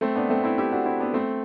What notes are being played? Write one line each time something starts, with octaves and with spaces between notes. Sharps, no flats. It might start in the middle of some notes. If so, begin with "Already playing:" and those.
A3 C4
B3 D4
A3 C4
C4 E4
E4 G4
D4 F#4
C4 E4
B3 D4
A3 C4